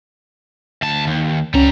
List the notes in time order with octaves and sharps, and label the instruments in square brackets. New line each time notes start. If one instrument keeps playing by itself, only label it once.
[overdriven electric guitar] D2 A5
D#2
[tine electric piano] C#2 C#4 [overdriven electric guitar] G3 A#5